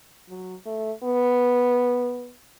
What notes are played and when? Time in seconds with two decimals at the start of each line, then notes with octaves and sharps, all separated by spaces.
0.29 F#3
0.66 A3
1.03 B3